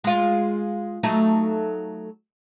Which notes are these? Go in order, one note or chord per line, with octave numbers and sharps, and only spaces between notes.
G#3 F4
F#3 A3 D#4